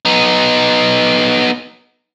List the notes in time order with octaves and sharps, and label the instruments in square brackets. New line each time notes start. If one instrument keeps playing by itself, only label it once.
[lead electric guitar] B3 D#4